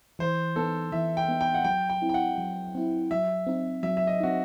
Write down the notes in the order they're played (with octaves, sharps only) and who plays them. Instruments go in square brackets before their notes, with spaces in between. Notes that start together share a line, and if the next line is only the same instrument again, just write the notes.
[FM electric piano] E3 [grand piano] C5
[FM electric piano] B3 D#4 [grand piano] A4
[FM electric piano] E3 [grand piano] E5
[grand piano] G5
[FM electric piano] B3 D#4
[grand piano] G5
F#5
[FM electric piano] F#3 [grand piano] G5
[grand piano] G5
[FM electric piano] C4 E4
[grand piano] G5
F#5
[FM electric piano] F#3
C4 E4
[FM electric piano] F#3 [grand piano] E5
[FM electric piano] C4 D#4
[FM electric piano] F#3 [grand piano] E5
[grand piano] E5
D#5
[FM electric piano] C4 D#4 [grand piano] F#4